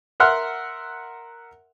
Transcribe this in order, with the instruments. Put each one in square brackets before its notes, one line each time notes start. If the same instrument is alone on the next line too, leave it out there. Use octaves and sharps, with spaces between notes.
[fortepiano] A#4 E5 F#5 C6 F6 F#6